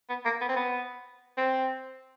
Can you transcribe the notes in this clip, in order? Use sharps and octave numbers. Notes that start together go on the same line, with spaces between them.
B3
A#3
B3
C4
B3
C4